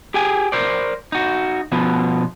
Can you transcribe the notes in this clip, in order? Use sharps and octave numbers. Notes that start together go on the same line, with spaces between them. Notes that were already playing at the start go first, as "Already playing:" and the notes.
G4 G#4 G5 G#5
A#4 C5 D5
D#4 F#4
B2 F3 B3